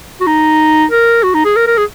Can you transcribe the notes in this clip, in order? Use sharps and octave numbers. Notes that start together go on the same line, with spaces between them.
F#4
D#4
A#4
F#4
D#4
G#4
A#4
A#4
G#4